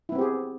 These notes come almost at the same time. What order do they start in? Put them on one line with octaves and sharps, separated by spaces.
E4 B3 C4 G4 G#4